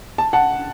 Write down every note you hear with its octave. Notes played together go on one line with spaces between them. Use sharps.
A5
F#5 A5